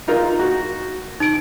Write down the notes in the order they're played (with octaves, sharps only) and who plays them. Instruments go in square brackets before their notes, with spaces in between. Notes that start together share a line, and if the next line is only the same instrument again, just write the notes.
[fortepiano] D#4 F4 A#4
F#4
[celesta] D#4 D7